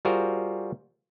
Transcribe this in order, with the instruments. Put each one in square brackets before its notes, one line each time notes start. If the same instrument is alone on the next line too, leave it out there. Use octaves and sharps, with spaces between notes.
[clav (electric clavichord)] G3 F4 F#4 G#4 A#4 C5